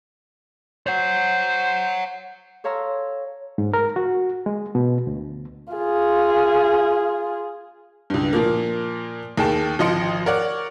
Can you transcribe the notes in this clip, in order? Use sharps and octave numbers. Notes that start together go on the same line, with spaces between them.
C5 C#5 F#5
A4 C#5 F5 A#5 C6 E6
G#2
A#4
F#4
G#3
B2
D2
F4 G#4
C#2 G2
A#2 F3 A#3
D#2 D#3 G#4 G5 A5
G#1 F3 D#5 C6 C#7 D7
A#4 C#5 D5 F#5